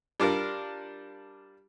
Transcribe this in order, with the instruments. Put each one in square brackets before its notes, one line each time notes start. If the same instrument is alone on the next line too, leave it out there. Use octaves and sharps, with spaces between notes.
[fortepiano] G3 D4 F4 A#4